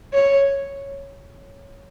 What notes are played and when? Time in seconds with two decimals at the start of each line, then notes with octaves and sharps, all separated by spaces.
0.13 C#5